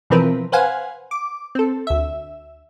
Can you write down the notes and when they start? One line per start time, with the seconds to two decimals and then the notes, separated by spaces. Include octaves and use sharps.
0.10 B2 E3 F3 C4 A#4 B4
0.52 B4 C5 F5 F#5 G#5
1.11 D6
1.55 C4 A4
1.87 D2 E5